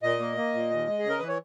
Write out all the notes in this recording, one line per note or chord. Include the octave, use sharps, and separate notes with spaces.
A#2 D#5
A#3
A#3
A#2
D#2
G#3
G#4
C#3
A#4
E3 B4
C#5